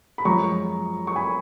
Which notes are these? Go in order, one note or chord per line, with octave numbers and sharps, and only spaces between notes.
B5
F#2 F3 G#3 A#5 C#6
C#6
G#5 B5